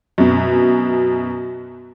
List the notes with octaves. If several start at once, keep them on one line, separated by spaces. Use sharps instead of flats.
F#2 B2